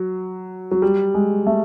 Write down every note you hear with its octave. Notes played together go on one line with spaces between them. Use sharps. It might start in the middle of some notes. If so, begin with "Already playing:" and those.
Already playing: F#3
F#3
G3
G#3
A3